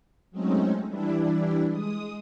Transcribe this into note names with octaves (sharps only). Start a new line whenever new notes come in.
F#3 G#3 A3 C4 C#4 D#4
E3 G3 D4 E4
G#3 D#6